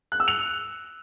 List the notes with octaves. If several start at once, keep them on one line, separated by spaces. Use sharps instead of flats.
F#6
E6
F7